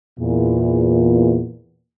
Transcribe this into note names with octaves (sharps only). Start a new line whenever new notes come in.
E2 A#2